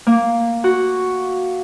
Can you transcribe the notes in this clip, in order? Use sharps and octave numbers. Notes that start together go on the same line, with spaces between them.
A#3
F#4